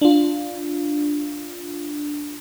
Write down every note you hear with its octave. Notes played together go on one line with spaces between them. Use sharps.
D4 F4